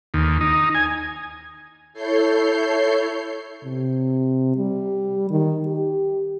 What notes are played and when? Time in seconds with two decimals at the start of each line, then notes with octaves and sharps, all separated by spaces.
0.14 D#2
0.41 D#4
0.75 G#5
1.93 E4 A4 C#5 G6 C7
3.64 C3
4.57 G3
5.31 D#3
5.67 G4